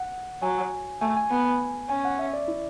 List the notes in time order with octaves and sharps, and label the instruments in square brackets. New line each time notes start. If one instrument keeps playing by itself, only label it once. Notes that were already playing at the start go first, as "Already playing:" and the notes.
Already playing: [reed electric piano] F#5
[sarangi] F#3 [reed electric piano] G#5
[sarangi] A3 [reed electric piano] G#5
[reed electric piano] G#5
[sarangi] B3
[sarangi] C#4 [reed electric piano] G#5
[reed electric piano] F#5
E5
D5
E4